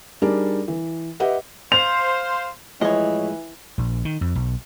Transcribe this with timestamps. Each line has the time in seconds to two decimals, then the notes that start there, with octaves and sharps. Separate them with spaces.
0.22 G3 D4 D#4 G#4 A#4 D5
0.68 E3
1.20 G4 B4 D#5 E5 F#5
1.72 C5 F5 F7
2.81 A2 E3 F3 G#3 C#5 D#5
3.78 A#1
4.05 D#3
4.21 F2
4.35 B1